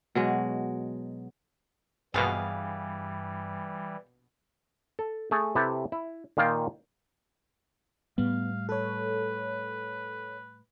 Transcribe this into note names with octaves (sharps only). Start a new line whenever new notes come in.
B2 F#3 G#3
A#1 G2 B2 E3 G3 G#4 F5
A4
A3 G#4 A4
C3 E4 G4 A4 B4
E4
A#2 D#3 A#3 F4 F5 G5
A2 G3 B3 F5
A4 B4 C#5